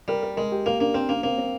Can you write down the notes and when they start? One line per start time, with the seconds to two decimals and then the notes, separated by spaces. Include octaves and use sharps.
0.08 G3 A#4
0.23 A#4
0.37 G#3 A#4
0.52 G4
0.66 A#3 A#4
0.81 A#3 D4
0.94 C4 A#4
1.09 A#3 D4
1.23 A#3 C4
1.38 C4